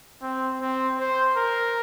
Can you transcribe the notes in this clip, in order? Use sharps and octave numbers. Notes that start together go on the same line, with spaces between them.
C4
C4
C5
A#4